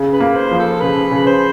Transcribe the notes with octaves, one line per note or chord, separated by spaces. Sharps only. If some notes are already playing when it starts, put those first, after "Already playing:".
Already playing: C#3
B4
A#3
C5
F3
A4
C#3 B4
C#3
C5